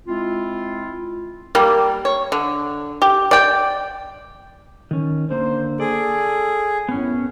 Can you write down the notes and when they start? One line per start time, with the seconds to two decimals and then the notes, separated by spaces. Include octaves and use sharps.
0.07 G#3 C4 E4 F4
1.55 G3 A#3
2.05 C#5
2.32 D3
3.02 G4
3.31 D5 G5
4.91 D#3 C#4
5.31 D3 A#3 C5
5.80 G#4 A4 D5
6.89 F#2 A2 B3 C#4